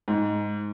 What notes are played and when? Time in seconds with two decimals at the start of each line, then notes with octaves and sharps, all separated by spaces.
0.08 G#2